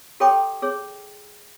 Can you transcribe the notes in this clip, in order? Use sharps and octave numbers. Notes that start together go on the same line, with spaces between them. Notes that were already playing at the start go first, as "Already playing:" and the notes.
G4 A4 C#5 G5 B5 D6
G#4 C#5